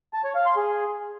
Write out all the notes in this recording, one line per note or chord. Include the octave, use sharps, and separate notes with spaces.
A5
C#5
F5
C6
G#4